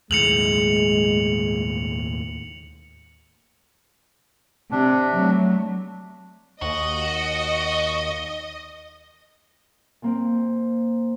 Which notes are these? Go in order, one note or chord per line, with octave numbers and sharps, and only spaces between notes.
D#2 A2 G#3 C#7 F7 F#7
C3 D4
F#3 A3
D#2 F#4 D#5
A#2 A#3 C4